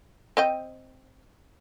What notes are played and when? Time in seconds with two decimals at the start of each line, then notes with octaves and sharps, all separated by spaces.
0.37 C4 D#5 G5